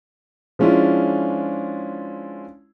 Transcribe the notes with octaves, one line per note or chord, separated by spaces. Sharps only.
F3 G#3 C#4 D4 E4 F4